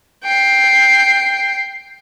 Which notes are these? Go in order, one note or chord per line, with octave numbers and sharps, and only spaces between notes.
G5 C7